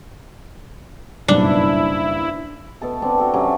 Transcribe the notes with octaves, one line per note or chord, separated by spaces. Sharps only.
F#1 B1 G2 D4 E4
B2 A4 A5
C4 D4 A5
F#4 A4 G5
C3 F#3 C#4